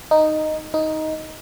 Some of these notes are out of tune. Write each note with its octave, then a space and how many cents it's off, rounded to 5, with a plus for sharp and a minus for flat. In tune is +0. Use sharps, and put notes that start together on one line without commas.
D#4 -5
D#4 +10